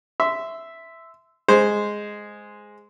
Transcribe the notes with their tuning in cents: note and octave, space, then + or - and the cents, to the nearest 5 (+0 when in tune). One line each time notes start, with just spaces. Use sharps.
E5 +0 C6 -20
G#3 +0 C5 -10